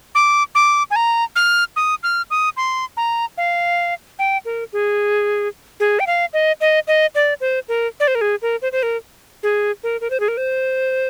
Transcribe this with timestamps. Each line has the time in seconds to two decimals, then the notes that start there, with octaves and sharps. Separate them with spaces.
0.15 D6
0.55 D6
0.91 G#5
0.96 A#5
1.36 F6
1.76 D#6
2.03 F6
2.31 D#6
2.57 C6
2.97 A#5
3.38 F5
4.19 G5
4.45 A#4
4.73 G#4
5.80 G#4
6.00 G5
6.07 F5
6.33 D#5
6.61 D#5
6.87 D#5
7.15 D5
7.41 C5
7.69 A#4
8.00 D5
8.08 C5
8.15 A#4
8.21 G#4
8.42 A#4
8.62 C5
8.72 C5
8.83 A#4
9.43 G#4
9.84 A#4
10.01 A#4
10.10 C5
10.20 G#4
10.28 A#4
10.37 C5